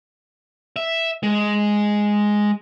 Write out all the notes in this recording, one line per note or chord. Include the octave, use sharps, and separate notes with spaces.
E5
G#3